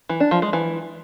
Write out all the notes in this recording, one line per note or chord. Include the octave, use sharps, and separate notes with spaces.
E3
D4
F3
G#3
E3